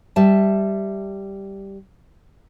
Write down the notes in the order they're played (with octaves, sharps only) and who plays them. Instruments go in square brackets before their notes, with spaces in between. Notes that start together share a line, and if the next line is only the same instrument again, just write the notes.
[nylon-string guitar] G3 E5 A5